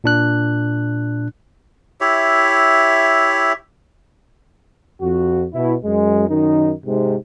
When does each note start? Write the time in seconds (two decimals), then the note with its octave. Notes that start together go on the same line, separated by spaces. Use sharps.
0.04 A#2 D4 F#6
2.01 E4 G4 C#5 E5
5.02 F2 F#4
5.54 B2 E4
5.85 F#2 G#3
6.29 F#2 D#3 D#4
6.86 G#2 C3